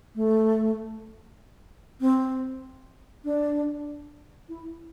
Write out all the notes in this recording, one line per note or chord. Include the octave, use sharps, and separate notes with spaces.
A3
C4
D4
E4